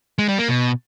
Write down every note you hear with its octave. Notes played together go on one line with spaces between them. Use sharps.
G#3
G3
A#3
B2